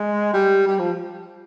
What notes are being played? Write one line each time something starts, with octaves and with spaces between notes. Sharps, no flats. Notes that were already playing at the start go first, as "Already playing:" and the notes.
Already playing: G#3
G3
G3
F3